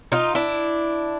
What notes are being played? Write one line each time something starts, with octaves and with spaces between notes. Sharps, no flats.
D#4 F4
D4 E4